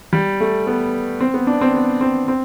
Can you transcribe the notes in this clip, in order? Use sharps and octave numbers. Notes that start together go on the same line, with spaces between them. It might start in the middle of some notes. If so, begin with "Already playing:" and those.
G3
A3
B3
C4
B3
D4
C4
B3
C4
C4